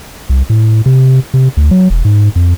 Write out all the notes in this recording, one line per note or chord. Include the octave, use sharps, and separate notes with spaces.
C2
A2
C3
C3
D2
F#3
E1
G#2
F2